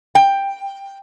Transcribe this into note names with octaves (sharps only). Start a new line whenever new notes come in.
G5